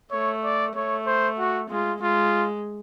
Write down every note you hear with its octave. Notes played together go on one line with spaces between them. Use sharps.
A3 C#5
D5
A3 C#5
C5
F#4
G#3 F4
G#3 F4